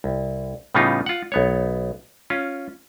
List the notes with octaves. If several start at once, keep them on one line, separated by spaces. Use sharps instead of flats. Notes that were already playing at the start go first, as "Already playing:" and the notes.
C2
A2 C#3 G3 B3 D#4 F4
F4 F#5
B1 B3 C#5
C#4 F4